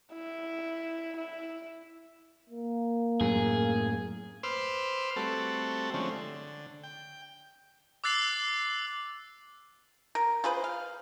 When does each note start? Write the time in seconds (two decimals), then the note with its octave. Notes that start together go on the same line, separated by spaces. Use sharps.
0.13 E4
1.17 E4
2.49 A#3
3.21 F#2 A2 G#4
4.43 B4 C5 C6 D6 E6 F6
5.16 G3 A3 C4 F#4 A4
5.94 D3 F3 G#3 A3 C4 C#4
6.11 D3
6.83 G5
8.04 D6 E6 F#6 A6 C7 F#7
10.15 A#4
10.44 F4 G#4 B4 C5
10.64 F5